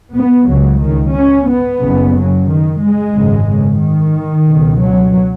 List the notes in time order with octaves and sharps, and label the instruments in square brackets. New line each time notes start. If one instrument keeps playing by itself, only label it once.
[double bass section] B3
C#2 C#3 F#3
D#3
C#4
B3
F#1 F#2 C#3
F#3
D#3
G#3
G#1 F#2 C#3
C#3
D#3
C#2 B2
F#3